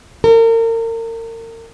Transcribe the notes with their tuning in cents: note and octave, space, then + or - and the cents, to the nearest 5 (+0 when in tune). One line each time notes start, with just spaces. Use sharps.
A#4 -35